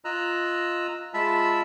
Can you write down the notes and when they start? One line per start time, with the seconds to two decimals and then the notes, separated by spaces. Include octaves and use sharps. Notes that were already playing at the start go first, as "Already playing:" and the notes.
0.05 F4 D#5 A#5 E6 F#6
1.14 G#3 F4 E5 A5 B5 E6